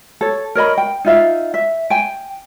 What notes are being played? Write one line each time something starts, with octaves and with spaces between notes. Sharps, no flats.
A4 C#5
A#4 C#5 D#5 B5
G5
D#4 F4 E5 F5
E5
G5 G#5